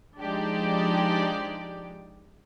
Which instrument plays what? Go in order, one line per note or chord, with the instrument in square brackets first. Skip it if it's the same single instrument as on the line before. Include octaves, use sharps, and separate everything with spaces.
[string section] F3 G#3 D4 D#4 G4 D5